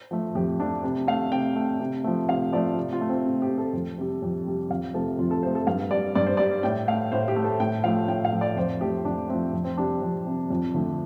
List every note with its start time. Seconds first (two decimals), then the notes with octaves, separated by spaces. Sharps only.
0.11 F3 A3
0.35 F2 G4
0.59 F3 A3 D4
0.83 C3
1.07 A3 F5
1.31 C3 G5
1.56 A3
1.80 C3
2.04 F3 A3
2.29 C3 F5
2.53 F3 A3 D5
2.77 C3
2.93 F4
3.01 A3
3.09 C4
3.25 C3
3.42 G4
3.49 A3
3.58 A4
3.73 F2
3.98 C3 G3
4.22 F2
4.46 C3 G3
4.70 F2 F5
4.94 C3 F3 A3 A4
5.19 F2 F4
5.31 A4
5.43 C3 F3 A3 C5
5.55 A4
5.67 G2 F5
5.91 G3 D5
6.15 G2 D5
6.27 C5
6.37 G3 D5
6.63 A2 G5
6.88 A3 F5
7.12 A2 C5
7.28 G4
7.36 A3
7.44 A4
7.60 A2 G5
7.84 F3 A3 F5
8.08 A2 G5
8.25 F5
8.32 F3 A3
8.41 D5
8.57 F2 C5
8.81 F3 A3 G4
9.05 F2 D4
9.30 F3 A3 C4
9.53 F2
9.64 C4
9.77 C3 G3 D4
10.02 F2
10.26 C3 G3
10.50 F2
10.74 D3 F3 A3